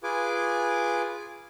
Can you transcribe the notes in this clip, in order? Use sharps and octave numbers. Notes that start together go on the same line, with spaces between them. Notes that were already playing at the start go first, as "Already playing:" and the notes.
F4 G#4 B4 G#5 D6